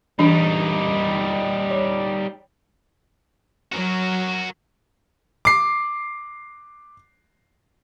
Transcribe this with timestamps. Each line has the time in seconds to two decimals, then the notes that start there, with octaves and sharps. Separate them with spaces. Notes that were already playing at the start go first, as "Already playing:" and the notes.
0.19 E3 G3 D4 D#4 B5
1.71 C#5
3.72 F#3 F#4 A#4
5.45 D6 C7